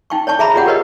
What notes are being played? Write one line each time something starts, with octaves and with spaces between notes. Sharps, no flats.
D#4 G5 C#6
C#5 D5 A5 C#6
G#4 E5 A#5 B5
F4 G4 G#4 D5 F#5 G5
G4 A#4 B4 C#5 D#5